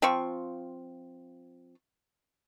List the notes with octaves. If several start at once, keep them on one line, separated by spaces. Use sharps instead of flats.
F3 C4 F4 C#6